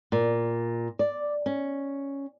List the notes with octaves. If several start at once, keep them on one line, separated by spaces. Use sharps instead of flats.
A#2
D5
C#4